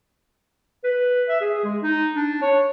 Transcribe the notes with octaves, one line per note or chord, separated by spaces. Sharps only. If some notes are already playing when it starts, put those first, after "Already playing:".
B4
E5
G#4
G#3
D#4
D4
C#5